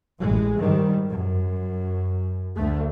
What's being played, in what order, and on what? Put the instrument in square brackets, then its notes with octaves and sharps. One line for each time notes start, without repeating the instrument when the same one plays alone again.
[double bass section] A1 G#3
G#2 D#3 G3
F#2
D2 A3